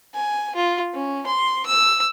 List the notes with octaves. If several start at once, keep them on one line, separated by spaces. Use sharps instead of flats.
G#5
F4
C#4
C6
E6